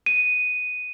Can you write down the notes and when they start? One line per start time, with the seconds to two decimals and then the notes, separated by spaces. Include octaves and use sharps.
0.06 D#7